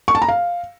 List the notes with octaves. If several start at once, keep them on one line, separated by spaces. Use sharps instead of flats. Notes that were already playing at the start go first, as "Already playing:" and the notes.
C#6
A5
A#5
F5